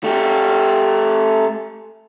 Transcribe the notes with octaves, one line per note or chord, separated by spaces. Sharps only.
A3 G4